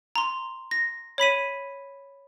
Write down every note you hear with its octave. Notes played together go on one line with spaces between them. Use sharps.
A#5 C6
A#6
C#5 B5 B6 D#7